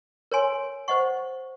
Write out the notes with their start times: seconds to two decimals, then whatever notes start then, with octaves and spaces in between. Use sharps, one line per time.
0.32 A#4 C#5 G#5 C6
0.88 C5 D#5 F#5 C#6